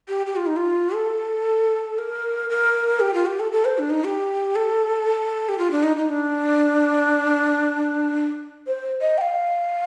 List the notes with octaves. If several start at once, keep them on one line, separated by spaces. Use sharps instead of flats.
G4
G4
F4
D#4
F4
A4
A#4
A#4
G4
F4
G4
A4
A4
C5
D4
D#4
G4
A4
G4
F4
D4
D#4
D#4
D4
C5
D#5
G5
F5